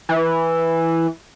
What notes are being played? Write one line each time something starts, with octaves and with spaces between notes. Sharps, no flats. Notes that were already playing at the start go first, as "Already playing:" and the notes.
E3